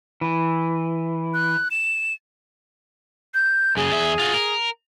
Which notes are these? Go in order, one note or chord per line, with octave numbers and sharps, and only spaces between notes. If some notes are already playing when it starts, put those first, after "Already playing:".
E3
F#6
E7
G6
F#2 C#3 G#4
E2 E5
F4 F#4
A#4